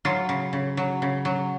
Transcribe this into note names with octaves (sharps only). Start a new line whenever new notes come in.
F#3 F4
C#3
C#3
F#3
C#3
F#3